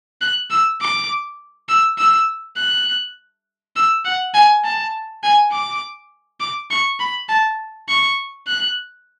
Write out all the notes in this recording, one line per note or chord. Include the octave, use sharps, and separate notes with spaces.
F#6
E6
D6
E6
E6
F#6
E6
F#5
G#5
A5
G#5
D6
D6
C#6
B5
A5
C#6
F#6